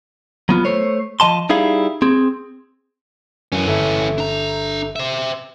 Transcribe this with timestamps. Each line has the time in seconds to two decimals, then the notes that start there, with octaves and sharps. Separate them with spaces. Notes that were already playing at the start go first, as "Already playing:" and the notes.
0.49 F#3 B3 F4
0.65 A3 C5 C#5
1.20 F3 D#5 A5 C6
1.49 G3 D#4 E4 G#4 F5
2.02 C4 G#4
3.52 F#2 E3 C#4
3.66 G1 A4 E5
4.18 D4 A#5
4.96 C5 E5